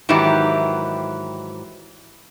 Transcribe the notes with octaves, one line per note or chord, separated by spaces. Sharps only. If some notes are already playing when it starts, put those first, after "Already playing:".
G#2 D#3 E3 F#3 E4 G4